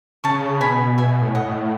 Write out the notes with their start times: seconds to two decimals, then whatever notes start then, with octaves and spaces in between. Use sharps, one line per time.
0.24 C#3 A5 C#6
0.61 B2 G#5 B5
0.98 B2 E5 G#5
1.21 A2
1.35 D#5 F#5
1.46 A2